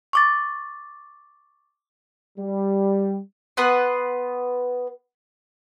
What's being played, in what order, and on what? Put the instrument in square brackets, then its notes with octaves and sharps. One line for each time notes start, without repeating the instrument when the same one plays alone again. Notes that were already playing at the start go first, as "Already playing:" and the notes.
[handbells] C#6 D6 A6
[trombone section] G3
[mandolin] B3 B4 F#5 C6